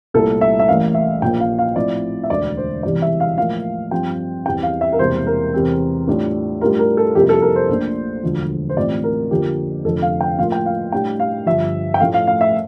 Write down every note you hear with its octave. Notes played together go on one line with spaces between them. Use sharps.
C2 A#2 A3 E4 A4
E5
E5
A1 A2 E3 A#3 F5
E5
A#1 A#2 F3 A#3 G5
F5
F5
A2 F3 C4 E4 D5
E5
E1 D2 D3 D5
C5
E1 E2 C3 E3 G3 D5
E5
F5
A2 F3 A#3 F5
G2 F3 C4 F4 G5
E2 E3 G3 C4 G5
F5
E5
A#4
E1 E2 C3 G3 A#3 C5
A#4
E2 C3 G3 C4
A2 G3 D4 F4
A2 G3 D4 F4 A#4
A#4
A4
F2 C3 G3 A#3 E4 G4
A4
A#4
C5
A#1 A#2 A3 D4
E1 D2 D3 F3
C5
A1 A2 G3 C4 F4 D5
A#4
F2 D3 F3 A#3 G4
F1 F2 D3 F3 A4
F5
G5
A2 F3 A#3 F4 F5
G5
F5
A2 G3 D4 G5
F5
G1 G2 F3 E5
G5
A2 F3 A3 F5
F5
F5
E5